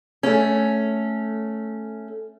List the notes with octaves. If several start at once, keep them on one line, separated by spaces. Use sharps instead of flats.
A3 C#4